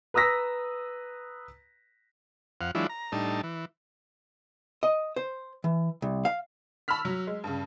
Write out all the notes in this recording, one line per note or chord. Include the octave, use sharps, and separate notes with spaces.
B4 A#5 D#6 E6 A#6 B6
F2 F5 F#5
E3 F#3 G#3 D4 E4 F4
A#5
A2 G3 D4 D#4 A5
E3
D#5
C5
E3
C2
F5
A5 B5 C#6 E6 F6 B6
F#3
G#3
G2 C#3